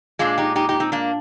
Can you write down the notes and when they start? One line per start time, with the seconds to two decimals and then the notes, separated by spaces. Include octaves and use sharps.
0.19 A#2 G#3 D4 F4
0.38 D#4 G4
0.56 D#4 G4
0.69 D#4 G4
0.80 C4 D#4
0.92 A#3 D4